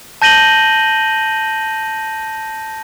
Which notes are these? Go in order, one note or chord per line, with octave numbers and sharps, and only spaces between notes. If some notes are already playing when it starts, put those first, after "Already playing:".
A5 G6 A#6 D#7 F#7 G7